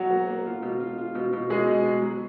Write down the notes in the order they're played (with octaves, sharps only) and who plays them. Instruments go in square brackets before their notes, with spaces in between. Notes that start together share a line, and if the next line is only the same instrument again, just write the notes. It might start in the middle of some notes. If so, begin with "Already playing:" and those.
Already playing: [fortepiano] B2 [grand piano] F#3 F#4
[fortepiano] A#3
A#3
F4
B2
F4
F4
B2
B2
[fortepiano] B2 [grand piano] G#3 G#4
[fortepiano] B2
B2
F#3